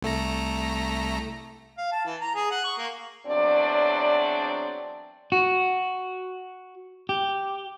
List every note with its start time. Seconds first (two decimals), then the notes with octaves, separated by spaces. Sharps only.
0.02 C2 A3 A#5
1.78 F5
1.92 A5
2.06 E3
2.21 A#5
2.35 G#4
2.51 F#5
2.64 C#6
2.78 A#3
3.27 E2 F#3 C4 D4 D5
5.32 F#4
7.09 G4